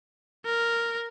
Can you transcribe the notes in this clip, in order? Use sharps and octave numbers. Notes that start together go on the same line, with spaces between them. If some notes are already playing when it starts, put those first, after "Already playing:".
A#4